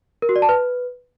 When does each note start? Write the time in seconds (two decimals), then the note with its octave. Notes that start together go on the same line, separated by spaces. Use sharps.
0.22 A#4
0.29 F#4
0.36 D5
0.42 A5
0.49 B4